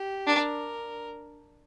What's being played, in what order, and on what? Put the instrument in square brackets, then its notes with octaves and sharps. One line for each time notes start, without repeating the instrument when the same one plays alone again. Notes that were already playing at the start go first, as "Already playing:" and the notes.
Already playing: [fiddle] G4
[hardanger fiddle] D4 [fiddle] A#4